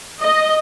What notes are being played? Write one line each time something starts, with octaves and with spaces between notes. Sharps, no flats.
D#5